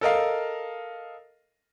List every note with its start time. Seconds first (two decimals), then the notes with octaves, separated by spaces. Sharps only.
0.01 A4 A#4 D#5 F5